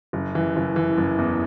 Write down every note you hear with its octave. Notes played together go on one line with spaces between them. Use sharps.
F#1
E3
F#1
E3
F#1
E2